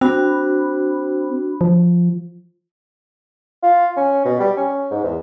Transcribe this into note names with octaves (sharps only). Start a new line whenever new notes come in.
C4 D4 F#4 B5
F3
F4
C#4
B2
G3
C#4
G#2
E2